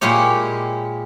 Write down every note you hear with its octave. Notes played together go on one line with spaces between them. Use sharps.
A#2 G#3 E4 G4 C#5